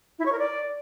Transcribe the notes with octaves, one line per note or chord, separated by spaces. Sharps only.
E4
C#5
A#4
D5